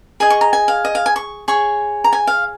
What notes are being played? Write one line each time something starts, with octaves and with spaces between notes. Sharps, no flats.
G#4 D#5 G#5
C#6
A#5
G#5
F5
D#5
F5
G#5
C#6
G#4 C#5 C#6
A#5
G#5
F5